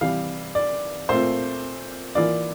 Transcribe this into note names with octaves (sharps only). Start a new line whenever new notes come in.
C3 E3 G3 F5
D5
A#2 A3 C4 F4 C5
E3 A#3 F4 D5